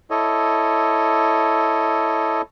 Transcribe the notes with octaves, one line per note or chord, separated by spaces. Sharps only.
E4 A4 C#5 D#5